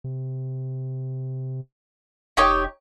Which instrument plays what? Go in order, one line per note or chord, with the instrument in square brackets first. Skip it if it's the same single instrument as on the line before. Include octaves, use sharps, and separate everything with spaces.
[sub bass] C3
[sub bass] F1 [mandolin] D#4 G4 C#5